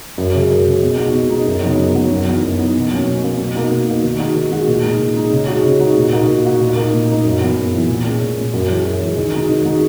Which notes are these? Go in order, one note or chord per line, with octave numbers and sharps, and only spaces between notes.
F#2
C#3 G#3
F#2
C#3 G#3
B2
G#3 D#4 F#4
B2
G#3 D#4 F#4
F#2
C#3 F#3 B3 D#4
F#2
C#3 F#3 B3 D#4
F#2
E3 B3 D#4
F#2
E3 B3 D#4
B2
F#3 A#3 C#4
B2
F#3 A#3 C#4
B2
A#3 D#4 F#4
B2
A#3 D#4 F#4
D#3
G#3 D#4 F#4
D#3
G#3 D#4 F#4
A#2
G#3 D#4
A#2
G#3 D#4
C#3
G#3 D#4 F#4
C#3
G#3 D#4 F#4
A#2
A#3 D#4 F#4
A#2
A#3 D#4 F#4
A#2
A#3 D#4
A#2
A#3 D#4
F#2
E3 B3 E4
F#2
E3 B3 E4
A#2
G#3 C#4
A#2
G#3 C#4
F#2
E3 G#3
F#2
E3 G#3
D#3
G#3 D#4 F#4
D#3
G#3 D#4 F#4